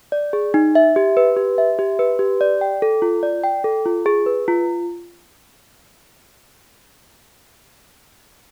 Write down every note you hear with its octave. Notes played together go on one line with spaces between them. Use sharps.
D5
G#4
D#4
E5
G4
B4
G4
E5
G4
B4
G4
D5
G5
A4
F4
D5
G5
A4
F4
G#4
B4
F4